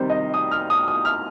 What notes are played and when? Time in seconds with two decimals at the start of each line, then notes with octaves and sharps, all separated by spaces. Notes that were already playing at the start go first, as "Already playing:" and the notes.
Already playing: C3 D#3 G3 C4 C5
0.10 D#5
0.34 D#6
0.51 F6
0.70 D#6
0.88 D#6
1.05 F6